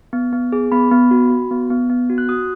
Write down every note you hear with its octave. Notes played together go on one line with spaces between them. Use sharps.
B3
B3
G#4
B3 B5
B3
F#4
F#4
B3
B3
B3
F#4
F#6
F#4 D#6